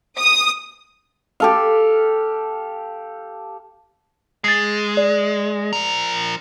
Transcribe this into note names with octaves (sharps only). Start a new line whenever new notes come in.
D#6
G4 A4 F5
G#3 A6 C7
D5
F3 A#4